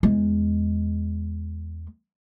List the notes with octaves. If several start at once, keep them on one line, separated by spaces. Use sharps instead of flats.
E2 G#3